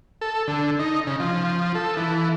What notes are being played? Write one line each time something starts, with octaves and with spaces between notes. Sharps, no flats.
A4
D3
D#4
C#3
F3
A4
E3